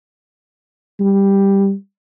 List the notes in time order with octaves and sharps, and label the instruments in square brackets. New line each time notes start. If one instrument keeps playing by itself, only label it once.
[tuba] G3